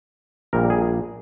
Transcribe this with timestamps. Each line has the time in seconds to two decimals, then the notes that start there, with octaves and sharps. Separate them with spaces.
0.53 A#1 A#2 G3 A#4
0.70 G#4